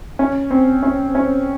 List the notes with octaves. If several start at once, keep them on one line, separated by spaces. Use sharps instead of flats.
C#4
C4
C#4
C#4